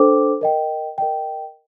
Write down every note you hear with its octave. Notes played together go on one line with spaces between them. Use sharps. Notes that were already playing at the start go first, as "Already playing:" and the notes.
Already playing: D4 A4 C5 G5 D6
A#4 D#5 G5
A#4 D#5 G5